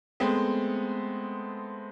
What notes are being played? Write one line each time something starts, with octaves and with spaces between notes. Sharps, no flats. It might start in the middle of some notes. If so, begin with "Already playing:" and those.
G#3 A3 B3 C4